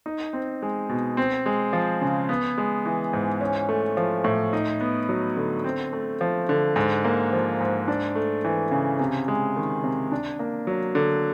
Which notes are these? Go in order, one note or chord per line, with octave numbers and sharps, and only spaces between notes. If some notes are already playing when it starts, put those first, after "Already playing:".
D#4
C4
G#3
B2
C4
G#3
F3
C#3
B3
G#3
E3
G#2
C#4
A3
F3
A2
D#4
B3
F#3
D3
C4
A3
F3
D3
G#2
A#3
F3
G#2
D4
A3
E3
C#3
C3
G#3
D#3
C3
D4
A#3
F#3
D3